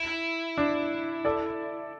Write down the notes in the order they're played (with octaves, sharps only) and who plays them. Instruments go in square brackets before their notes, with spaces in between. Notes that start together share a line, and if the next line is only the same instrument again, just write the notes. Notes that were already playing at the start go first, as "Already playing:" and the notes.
Already playing: [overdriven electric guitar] E4
[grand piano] D4
A4 D5